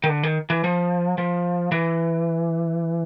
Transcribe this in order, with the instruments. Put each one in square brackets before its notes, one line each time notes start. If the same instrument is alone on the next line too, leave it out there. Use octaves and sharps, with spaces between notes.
[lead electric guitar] D#3
D3
D#3
E3
F3
F3
E3